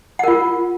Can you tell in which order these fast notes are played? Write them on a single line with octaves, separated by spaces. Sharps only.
F#5 A#4 F4